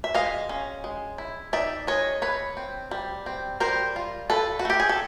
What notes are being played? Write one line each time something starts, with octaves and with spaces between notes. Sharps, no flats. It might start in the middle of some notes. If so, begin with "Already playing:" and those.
E5
G#3 D#5 F5
C#4
G#3
E4
D#4 D5 E5
G#3 C#5 D#5
E3 B4 C#5
C4
G3
C4
G3 A#4 C5
F4
F4 A4 B4
F#4
A3 G4
G#4
A4